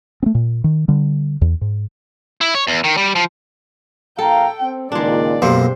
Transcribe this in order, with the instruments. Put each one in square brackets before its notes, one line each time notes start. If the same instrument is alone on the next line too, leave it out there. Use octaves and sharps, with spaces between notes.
[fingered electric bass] A3 C4
A#2
D#3
D3 G3
E2
G#2
[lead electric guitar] E4
C#5
E2
D#3
G3
F3
[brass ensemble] A#1 F5 A#5 [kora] A4 [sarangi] G5
[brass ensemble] C4
[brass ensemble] C#2 A#2 D#3 [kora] G#3 D4 [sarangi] D5
[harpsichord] B1 F#2 A#3 [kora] C3 C5